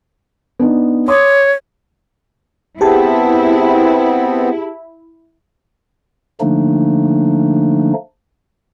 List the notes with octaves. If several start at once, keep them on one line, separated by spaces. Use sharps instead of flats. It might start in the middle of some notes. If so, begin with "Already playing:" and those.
B3 D4 D#4
C#5 C6 D6 D#6
B3 C4 E4 G4 G#4 A5
D3 F3 A3 A#3 D4 D#4